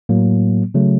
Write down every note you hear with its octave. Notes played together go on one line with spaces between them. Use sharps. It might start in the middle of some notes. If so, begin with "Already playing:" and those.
A2 F#3 A#3
C#3 F#3 A3